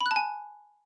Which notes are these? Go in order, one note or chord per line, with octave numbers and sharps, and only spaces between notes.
B5
F#6
A5
G#5